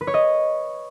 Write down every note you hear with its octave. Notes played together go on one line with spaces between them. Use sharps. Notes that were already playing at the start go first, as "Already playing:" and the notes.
B4
C#5
D#5